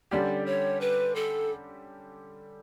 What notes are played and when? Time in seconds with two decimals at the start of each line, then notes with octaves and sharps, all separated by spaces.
0.11 D3 G3 C#4 G4 D5
0.46 C#5
0.81 B4
1.16 A4